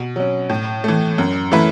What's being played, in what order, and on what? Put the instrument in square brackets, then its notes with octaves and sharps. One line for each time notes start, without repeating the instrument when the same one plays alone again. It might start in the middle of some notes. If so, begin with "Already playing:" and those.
Already playing: [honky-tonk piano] B2
F#3 C#4
A2
E3 A3
F#2
E3 A3 E4 B4